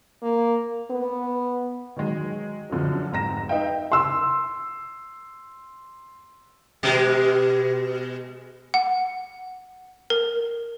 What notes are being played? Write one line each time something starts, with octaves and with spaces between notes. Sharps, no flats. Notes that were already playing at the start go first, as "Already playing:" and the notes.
A#3
B3
D#3 F#3 G#3
F#2 D3 F3 F#3
F1 G#2 A#5 A#6 E7
D#4 B4 E5 F5 G5
C6 E6
B2 G#3 G4
F#5
A#4